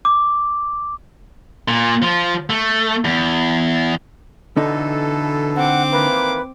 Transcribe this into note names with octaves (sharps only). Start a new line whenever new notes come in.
D6
A#2
F3
A3
E2
B2 D3 E3 D#4 A4
C4 F#5 D6
D#3 E3 A#3 B4